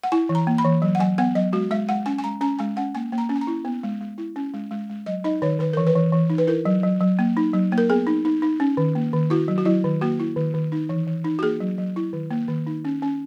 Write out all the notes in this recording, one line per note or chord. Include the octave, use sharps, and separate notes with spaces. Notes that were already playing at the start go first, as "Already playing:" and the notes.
F#5
E4 G#5
E3
A#5
A#3
B5
E3
F#3
F#5
F#3 G#5
B3 F#5
F#3 D#5
G#3 F#4
G#3 E5
G#3 F#5
C#4 G#5
G#5
G#3 A#5
C#4 A#5
G#3 G#5
C#4 F#5
A#3 G#5
A#3
A#5
C#4
G#5
A#5
E4
B3
G#3
G#3
E4
C#4
G#3
G#3
G#3
F#3 D#5
D#4 D#5
D#3 C#5
D#3 B4
E3 A#4
B4
E3
E3
D#4
B4
E4 A#4
F#3
F#3
F#3
A#3
D#4
F#3
A#3
A#4
B3 G#4
D#4
D#4
D#4
C#4
D#3
A#3
D#3
E4 F#4
F#3
F#4
F#3 E4
D#3
A#3 F#4
E4
D#3
D#3
D#4
E3
E3
D#4
F#4
A#3 G#4
F#3
F#3
E4
D#3
A#3
D#3
D#4
C#4
C#4